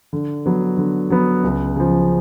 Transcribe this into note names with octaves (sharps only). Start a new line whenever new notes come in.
D3
F#3 B3
D3
F#3 B3
C#2
C#3 F3